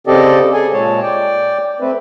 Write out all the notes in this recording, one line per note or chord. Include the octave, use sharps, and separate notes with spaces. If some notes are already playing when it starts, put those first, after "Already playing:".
C#3 C4 G4 A4 D5 D#5
G#4 A4 G#5
A#2 G#3 C#5 A5
D5 G5
A3 C4 B4